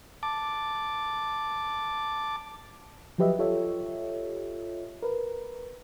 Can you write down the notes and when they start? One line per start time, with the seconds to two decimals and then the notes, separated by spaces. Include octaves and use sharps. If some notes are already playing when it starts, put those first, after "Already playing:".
0.23 A5 D6
3.18 F3 F#3 G4 B4 D#5 E5
3.39 F4 G4 A4 C#5 D#5 E5
5.02 A#4 B4